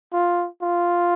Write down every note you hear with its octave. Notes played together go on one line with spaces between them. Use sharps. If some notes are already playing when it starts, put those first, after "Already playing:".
F4
F4